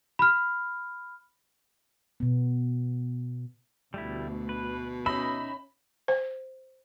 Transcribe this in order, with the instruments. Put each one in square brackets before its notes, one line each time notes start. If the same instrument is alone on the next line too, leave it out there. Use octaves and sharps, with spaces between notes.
[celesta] B5 F6
[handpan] B2 B3
[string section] D2 [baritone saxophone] B2 [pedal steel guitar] G3 A3 E4
[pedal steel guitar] B4
[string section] C#4 [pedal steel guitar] D#4 D#5 E5 [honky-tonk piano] B5
[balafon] C5